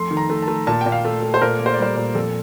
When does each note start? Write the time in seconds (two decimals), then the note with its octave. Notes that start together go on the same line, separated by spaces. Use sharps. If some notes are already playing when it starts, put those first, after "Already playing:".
Already playing: F2 A3 C6
0.11 D#3
0.17 A#5
0.30 A3
0.42 A5
0.48 A3
0.67 A#2 A5
0.81 A#2 G5
0.92 F5
1.05 A3
1.22 A3
1.34 C5
1.42 A#2 A#4
1.59 A#3
1.66 C5
1.74 D5
1.78 G3 C5
1.96 A#2
2.15 F2 A4